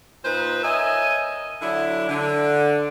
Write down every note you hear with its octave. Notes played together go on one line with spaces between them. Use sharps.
A#2 D#4 B4 C5
A#4 C#5 D#5 E5 G#5
D3 F#3 D4 E4
D3